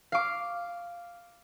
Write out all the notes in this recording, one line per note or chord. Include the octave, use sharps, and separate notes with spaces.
F5 D6